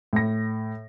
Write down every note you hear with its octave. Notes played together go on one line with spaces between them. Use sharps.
A2 A#6